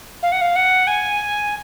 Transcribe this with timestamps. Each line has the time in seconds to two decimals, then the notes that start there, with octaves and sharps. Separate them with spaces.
0.22 F5
0.32 F#5
0.41 F5
0.56 F#5
0.87 G#5